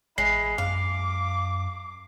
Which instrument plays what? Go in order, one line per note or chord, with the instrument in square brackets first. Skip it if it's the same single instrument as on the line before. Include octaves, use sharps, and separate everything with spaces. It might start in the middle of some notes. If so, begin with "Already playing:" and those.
[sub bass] A1 [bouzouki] G#3 [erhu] E4 [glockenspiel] C7
[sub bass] F#2 [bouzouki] F5 [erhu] D6